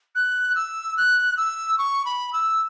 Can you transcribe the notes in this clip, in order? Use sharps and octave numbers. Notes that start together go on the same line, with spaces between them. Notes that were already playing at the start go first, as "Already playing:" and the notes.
F#6
E6
F#6
E6
C#6
B5
E6